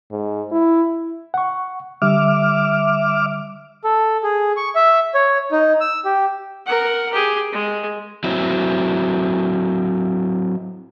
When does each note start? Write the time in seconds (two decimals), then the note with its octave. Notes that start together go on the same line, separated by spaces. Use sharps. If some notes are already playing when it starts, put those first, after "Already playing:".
0.11 G#2
0.52 E4
1.34 F#5 C#6
2.02 D3 G3 E5 D6 F6
3.84 A4
4.23 G#4
4.57 C#6
4.75 E5
5.15 C#5
5.52 D#4
5.81 E6
6.05 G4
6.66 A#4 F#5
7.13 G4 G#4
7.53 G#3
8.24 F#3 C4 E4